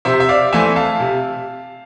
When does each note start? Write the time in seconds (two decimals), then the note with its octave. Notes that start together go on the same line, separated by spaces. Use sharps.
0.05 C3 C5 E5
0.20 E5
0.29 D5 F5
0.52 E3 A3 C4 E5 G#5
0.76 F5 A5
1.00 C3